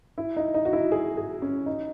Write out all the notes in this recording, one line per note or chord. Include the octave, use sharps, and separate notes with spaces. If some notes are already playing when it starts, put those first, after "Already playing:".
E4
D#4
D#4
F#4
E4
G#4
G#4
C#4
D#4